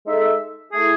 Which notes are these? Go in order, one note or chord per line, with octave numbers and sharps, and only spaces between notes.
G#3 D#4 A4 E5
A3 E4 G#4